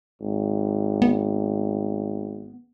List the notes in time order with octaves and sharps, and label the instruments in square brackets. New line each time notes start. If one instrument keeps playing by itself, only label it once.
[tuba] G#1
[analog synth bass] B3